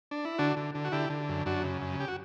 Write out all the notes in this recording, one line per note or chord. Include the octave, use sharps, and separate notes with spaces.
D4
E4
D3 D4 F#4
D3
D3
F#4
D3 E4 G4
D3
F#2
F#2 D4 F#4
C#3
F#2
G4
F#4